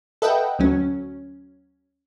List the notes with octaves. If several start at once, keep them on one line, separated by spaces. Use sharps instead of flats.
A4 B4 D#5 E5 F#5 G5
D2 F#3 C#4